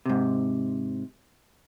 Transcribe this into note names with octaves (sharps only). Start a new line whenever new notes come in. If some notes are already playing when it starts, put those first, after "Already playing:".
G#2 C3